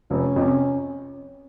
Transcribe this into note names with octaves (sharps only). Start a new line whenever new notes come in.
F1 C#4
F2 C3